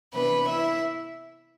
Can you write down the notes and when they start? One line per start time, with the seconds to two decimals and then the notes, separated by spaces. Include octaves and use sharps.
0.13 C3 E3 B3 D4 B4 B5
0.47 E4 E5